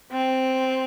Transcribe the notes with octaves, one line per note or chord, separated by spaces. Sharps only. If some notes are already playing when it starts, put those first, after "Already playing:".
C4